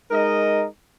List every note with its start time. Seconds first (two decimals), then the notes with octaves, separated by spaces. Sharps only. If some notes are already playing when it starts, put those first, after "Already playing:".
0.11 G#3 D#4 A#4 D#5